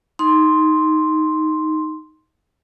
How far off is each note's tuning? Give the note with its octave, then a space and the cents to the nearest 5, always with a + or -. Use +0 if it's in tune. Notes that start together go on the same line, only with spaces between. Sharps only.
D#4 +5 C6 +0